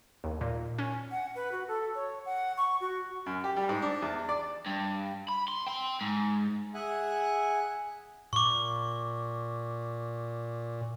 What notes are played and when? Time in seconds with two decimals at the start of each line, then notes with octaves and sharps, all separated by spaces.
0.24 D#2
0.41 A#2
0.78 C#4
1.11 F#5
1.35 B4
1.52 F#4
1.68 A4
1.95 C#5
2.26 F#5
2.57 C#6
2.81 F#4
3.26 F#2
3.44 G4
3.56 G3
3.69 G#2
3.82 D4
4.02 E2
4.29 D5
4.66 G2
5.28 B5
5.48 C6
5.66 G5 C6
6.01 G#2
6.74 G#4 E5 F#5 G#5
8.33 A#2 C#6 D6